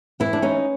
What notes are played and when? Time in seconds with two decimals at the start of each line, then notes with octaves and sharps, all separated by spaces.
0.20 E3 E4
0.33 D4
0.42 C#4 D#4